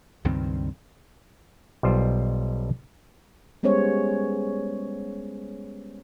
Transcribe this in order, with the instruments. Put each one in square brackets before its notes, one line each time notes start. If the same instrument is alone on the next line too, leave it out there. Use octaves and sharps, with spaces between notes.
[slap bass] C#2 G2 D#3 C4
[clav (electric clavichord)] B1 G3 F4 C5
[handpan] G3 G#3 B3 C#4 C5 C#5